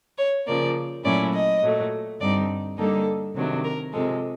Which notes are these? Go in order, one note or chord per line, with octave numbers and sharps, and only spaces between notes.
C#5
C#3 F3 A#3 D5
A#2 F#3 A3 C#4 E4 D5
D#5
A#2 F#3 A3
G2 D3 G3 C4 D#4 D5
D3 G3 A#3 D#4 A4
C3 D#3 F#3 A3 D4
A#4
C3 F3 G#3 A4